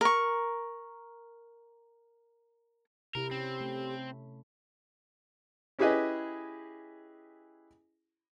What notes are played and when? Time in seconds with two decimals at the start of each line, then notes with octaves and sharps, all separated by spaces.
0.01 A#4 C#6
3.15 C3 E4 G4 A#4
3.31 C4 C#4
3.60 A3
5.79 C#4 E4 G4 G#4 B4 D#5